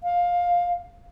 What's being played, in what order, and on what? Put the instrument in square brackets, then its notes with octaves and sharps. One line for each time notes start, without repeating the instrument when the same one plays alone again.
[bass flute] F5